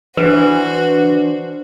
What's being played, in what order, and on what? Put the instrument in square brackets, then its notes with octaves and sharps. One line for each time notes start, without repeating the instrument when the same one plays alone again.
[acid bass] E3 [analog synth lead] D4 [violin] F#4 C5 [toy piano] B4